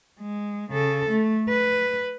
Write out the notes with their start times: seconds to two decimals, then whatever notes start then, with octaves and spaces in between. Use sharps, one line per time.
0.20 G#3
0.71 C#3 A4
1.10 A3
1.49 B4